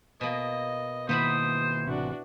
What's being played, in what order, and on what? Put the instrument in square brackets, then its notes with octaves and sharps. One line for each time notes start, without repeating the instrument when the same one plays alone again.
[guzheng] B2 A#3 [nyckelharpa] D#5
[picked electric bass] B2 D#3 A#3 [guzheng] B3 E4 B5 [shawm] C5 [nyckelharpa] D#6
[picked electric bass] A1 C3 [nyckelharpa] D4 F#4